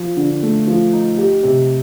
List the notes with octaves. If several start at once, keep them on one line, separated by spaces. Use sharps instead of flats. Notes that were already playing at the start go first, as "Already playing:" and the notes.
Already playing: F3
D3
A3
F3
D#4
G4
C3